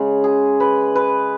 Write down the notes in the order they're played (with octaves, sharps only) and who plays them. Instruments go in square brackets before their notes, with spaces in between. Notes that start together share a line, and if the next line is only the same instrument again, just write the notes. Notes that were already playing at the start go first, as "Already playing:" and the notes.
Already playing: [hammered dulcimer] C#3 G#3
G#4
B4
B4